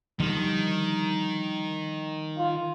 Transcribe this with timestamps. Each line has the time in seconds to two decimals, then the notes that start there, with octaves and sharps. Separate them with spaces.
0.20 D3 D#3 F3 G3
2.38 F4